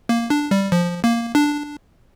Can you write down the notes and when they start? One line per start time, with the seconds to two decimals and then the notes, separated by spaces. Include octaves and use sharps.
0.09 A#3
0.30 D4
0.51 G3
0.72 F3
1.04 A#3
1.35 D4